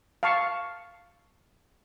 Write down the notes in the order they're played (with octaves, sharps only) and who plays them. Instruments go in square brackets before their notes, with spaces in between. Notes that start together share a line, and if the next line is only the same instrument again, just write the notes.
[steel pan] F5 A5 C#6